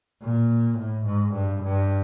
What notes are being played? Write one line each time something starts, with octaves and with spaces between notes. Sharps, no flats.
A#2
A2
G#2
G2
G2